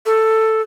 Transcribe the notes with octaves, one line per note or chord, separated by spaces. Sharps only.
A4